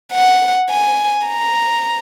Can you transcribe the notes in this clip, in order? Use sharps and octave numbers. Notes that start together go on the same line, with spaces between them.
F#5
G#5
A#5